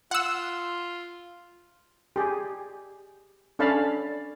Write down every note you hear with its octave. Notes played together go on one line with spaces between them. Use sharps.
F4 F#5 E6
G4 G#4
C#4 D4 A4 F5 A5 B5